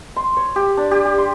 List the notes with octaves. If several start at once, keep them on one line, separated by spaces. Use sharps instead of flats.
C6
C#5
G4
D4
G4
G4
C6